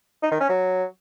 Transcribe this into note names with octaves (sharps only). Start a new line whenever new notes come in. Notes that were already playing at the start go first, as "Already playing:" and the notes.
D#4
D#3
C#4
F#3